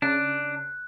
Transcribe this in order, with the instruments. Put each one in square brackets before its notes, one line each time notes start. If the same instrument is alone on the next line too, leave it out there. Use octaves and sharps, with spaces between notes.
[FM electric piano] C#3 [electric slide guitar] D4 [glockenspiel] F#6